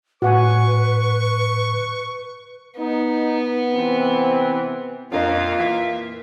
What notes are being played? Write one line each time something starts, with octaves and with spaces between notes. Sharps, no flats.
A2 F#4 B4 F#5 G#5 C#6
B3 D#4
C3 E3 C4
F2 A#2 D4 F4 A#4 D#5 F5
E3 A#3 E4 E5